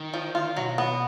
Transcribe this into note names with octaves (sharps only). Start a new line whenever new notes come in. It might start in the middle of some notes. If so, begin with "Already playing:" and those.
Already playing: D#3
F3
F4
B2 F#3
B3